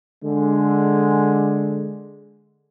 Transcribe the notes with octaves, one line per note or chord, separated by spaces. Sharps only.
D3 G#3